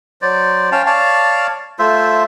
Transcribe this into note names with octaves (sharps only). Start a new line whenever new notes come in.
F#3 C5 D5
C#4 F5 G5 A5
C#5 D5 F5 A5
A3 F4 C5 E5